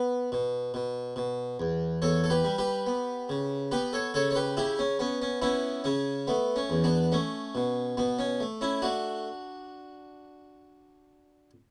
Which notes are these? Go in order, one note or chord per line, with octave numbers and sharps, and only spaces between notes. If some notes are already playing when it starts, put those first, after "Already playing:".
Already playing: B3 B4
B2
B2
B2
E2
E2 A4 C#5
A4
G4 B4
G3
G4 B4
B3
C#3
B3 G4 B4
A4 C#5
C#3 A4 C#5
C#5
G4 B4
C#3 E4 G4
C#4
B3 C#4
C#4
B3 C#4 E4
C#3 C#4
A3 B3
C#4
E2
B3 D4
A3 C#4
B2
B2 B3
C#4
A3
C#4 E4
A3 D4 F#4